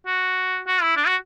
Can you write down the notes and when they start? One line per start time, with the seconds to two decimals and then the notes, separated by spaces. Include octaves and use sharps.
0.06 F#4
0.67 F#4
0.82 E4
0.97 D4
1.07 F#4